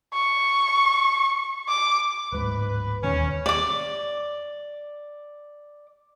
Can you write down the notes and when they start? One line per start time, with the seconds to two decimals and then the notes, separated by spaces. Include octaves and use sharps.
0.14 C#6
1.69 D6
2.32 D1 G#2 B4
3.03 E1 D#2 C#4
3.46 D5 D6